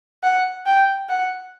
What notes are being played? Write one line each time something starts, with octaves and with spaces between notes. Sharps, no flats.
F#5
G5
F#5